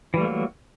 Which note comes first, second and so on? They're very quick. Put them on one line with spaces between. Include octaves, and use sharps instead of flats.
E3 G3 A3 A#3 F#3